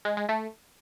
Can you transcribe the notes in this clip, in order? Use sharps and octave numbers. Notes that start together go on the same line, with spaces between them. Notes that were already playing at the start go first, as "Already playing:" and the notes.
G#3
G#3
A3